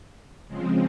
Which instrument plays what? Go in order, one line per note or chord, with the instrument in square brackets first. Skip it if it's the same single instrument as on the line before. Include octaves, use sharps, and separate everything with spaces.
[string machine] C#3 F3 G#3 C4